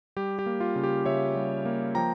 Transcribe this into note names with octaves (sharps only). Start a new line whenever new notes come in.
G3 G4
G4
A#3
F4
C#3
G4
C#3 C#5 E5
G3
A#3
F3 G5 A#5